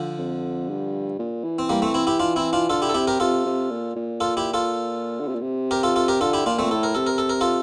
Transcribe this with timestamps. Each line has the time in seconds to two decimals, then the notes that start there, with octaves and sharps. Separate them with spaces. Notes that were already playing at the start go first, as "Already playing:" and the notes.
Already playing: D3 F3
0.18 F2
0.69 G2
1.19 A#2
1.44 E3
1.59 C4
1.69 G3 A#3
1.82 A3 C4
1.94 C4 E4
2.07 E4 G4
2.20 D4 F4
2.36 C4 E4
2.53 D4 F4
2.69 D3 F4 A4
2.82 E4 G4
2.89 A4
2.94 C3 E4 G4
3.07 G4 A#4
3.20 C3 F4 A4
3.46 C3
3.70 A#2
3.96 A#2
4.20 F4 A4
4.37 E4 G4
4.54 F4 A4
5.20 D3
5.28 C3
5.34 A#2
5.41 C3
5.71 G4 A#4
5.83 F4 A4
5.96 F4 A4
6.08 G4 A#4
6.21 D3 F4 A4
6.33 E4 G4
6.46 A#2 D4 F4
6.59 A3 C4
6.71 A2 A4
6.83 A#4
6.95 C3 A4
7.07 A#4
7.18 A4
7.29 A#4
7.41 F4 A4